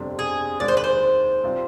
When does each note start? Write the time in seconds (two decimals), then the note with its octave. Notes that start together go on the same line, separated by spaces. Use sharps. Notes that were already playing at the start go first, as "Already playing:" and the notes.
Already playing: G1 F2 C3 G3 D4
0.19 G#4
0.60 D#2 D#3 G#3 D5
0.68 C5
0.77 B4
0.84 C5
1.44 C3 G3 C4 F4